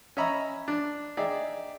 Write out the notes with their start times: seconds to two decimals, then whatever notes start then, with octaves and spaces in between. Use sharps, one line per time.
0.17 C#4 D#5 E5 A#5 B5
0.68 D4
1.17 D#4 G#4 D5 E5 G5